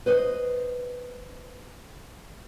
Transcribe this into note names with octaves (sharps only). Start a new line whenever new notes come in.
B4 C5 D#5